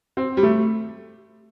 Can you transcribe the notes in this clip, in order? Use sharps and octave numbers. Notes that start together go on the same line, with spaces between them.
C4
G3
A3